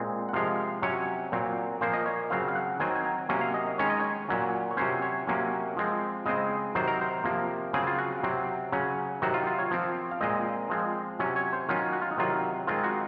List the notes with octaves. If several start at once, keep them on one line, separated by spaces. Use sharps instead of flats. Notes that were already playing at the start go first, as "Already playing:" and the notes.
Already playing: A#2 G#3 C4
F#5
C3 F3 G#3 F5
C3 F#3 C#4 C#5
A#2 F#3 C4
A#2 F3 A#3 C5
D#5
C#5
C#3 F#3 C4 F5
F5
F#5
D#3 F#3 C4 G#5
G#5
A#5
C3 F#3 A#3 C#4 G#5
F5
D#5
D#3 G#3 C#4 C#5
D#5
C#5
A#2 F#3 C#4
C#5
C3 F#3 C#4 C5
C#5
C3 F#3 A#3 C#4
F3 G#3 C4
C#3 G#3 C4 D#5
C3 D#3 F#3 C4 C5
A#4
C5
C3 F3 A#3
C#3 F#3 C4 G#4
F4
F#4
C3 F#3 C4
C#3 F#3 C#4
C3 D#3 F#3 C4 F#4
F4
F4
C#5
F3 C4
F5
A#2 G#3 C4 D#5
F3 G#3 C4
C3 F#3 C#4
C#5
C5
D#3 F#3 C#4 F4
F#4
F4
D#4
C3 D#3 F#3 F4
D#3 G#3 C4 F4
F#4